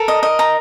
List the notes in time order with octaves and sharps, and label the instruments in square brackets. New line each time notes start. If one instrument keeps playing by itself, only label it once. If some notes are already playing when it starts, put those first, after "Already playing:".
Already playing: [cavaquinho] A4 [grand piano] A#4
[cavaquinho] D#5
D#5
A#5